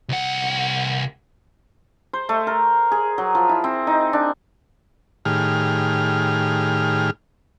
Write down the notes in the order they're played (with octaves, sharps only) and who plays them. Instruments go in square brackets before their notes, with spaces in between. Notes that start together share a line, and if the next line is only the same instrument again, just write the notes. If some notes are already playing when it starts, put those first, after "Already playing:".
[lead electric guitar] C2 F#5
[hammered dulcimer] C5
A3
A#4
G#4
F#3
F3
E4
C4
D#4
D4
[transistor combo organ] A2 D#3 G4 G#4 F6